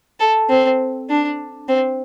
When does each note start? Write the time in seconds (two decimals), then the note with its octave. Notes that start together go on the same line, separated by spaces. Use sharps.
0.20 A4
0.50 C4
1.10 D4
1.69 C4